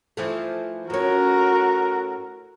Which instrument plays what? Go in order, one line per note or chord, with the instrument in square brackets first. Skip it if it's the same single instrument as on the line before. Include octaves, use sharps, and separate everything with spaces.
[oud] E3 F3 A3
[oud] A2 C#4 [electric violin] F#4 A#4